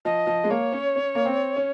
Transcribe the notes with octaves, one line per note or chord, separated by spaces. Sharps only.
F3 D#5
F3
G#3
A#3 C#5
C#4
C#4
A#3
C4
C#4